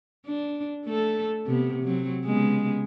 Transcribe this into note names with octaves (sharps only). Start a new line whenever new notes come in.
D4
A3 A4
C3 B3
F#3 C4
C#3 G#3 B3